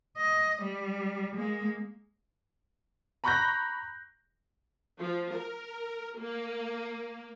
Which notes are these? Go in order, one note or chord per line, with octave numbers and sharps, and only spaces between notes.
D#5
G3
G#3 A#3
A#5 B5 C#6 F#6 G6 A#6
F3
A#4
A#3